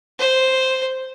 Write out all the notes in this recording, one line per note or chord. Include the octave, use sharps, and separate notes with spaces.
C5